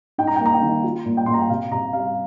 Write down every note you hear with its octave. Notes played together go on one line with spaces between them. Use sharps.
D#4 G5
A#5
G5
A#3
A#5
G5
D#3
F4
A#2
G5
A#2 C6
A#5
G5
C3 F5
C3 A#5
G3 F5